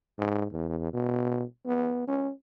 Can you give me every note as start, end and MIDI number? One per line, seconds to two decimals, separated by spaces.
0.18 0.46 44
0.51 0.92 40
0.93 1.43 47
1.66 2.03 59
2.08 2.32 61